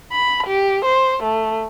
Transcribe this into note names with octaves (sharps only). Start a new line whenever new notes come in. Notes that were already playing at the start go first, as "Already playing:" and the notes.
B5
G4
C5
A3